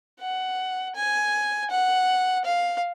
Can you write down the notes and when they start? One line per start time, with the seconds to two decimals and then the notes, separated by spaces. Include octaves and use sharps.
0.20 F#5
0.95 G#5
1.70 F#5
2.45 F5